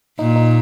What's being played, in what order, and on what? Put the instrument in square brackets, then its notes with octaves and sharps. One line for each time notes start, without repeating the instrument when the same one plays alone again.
[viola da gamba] A#2 [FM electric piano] D#4
[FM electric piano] D#4